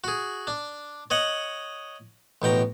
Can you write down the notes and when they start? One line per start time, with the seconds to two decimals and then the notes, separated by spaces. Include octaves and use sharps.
0.04 F#4 G#4
0.47 D4
1.10 C#5 D#5 F#5
2.42 A1 B2 G5 A#5